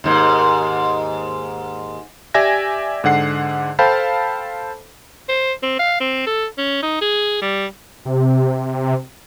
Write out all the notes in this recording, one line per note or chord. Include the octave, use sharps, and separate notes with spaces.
D#2 G#2
G4 D5 E5 G#5 G#6 A#6
G#2 D3 F#5 C7
A4 C5 F5 G5 A5 B5
C5
C4
F5
C4
A4
C#4
D#4
G#4
G3
C3